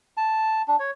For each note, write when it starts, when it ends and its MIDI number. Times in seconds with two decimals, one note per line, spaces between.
0.17 0.62 81
0.68 0.76 62
0.80 0.91 73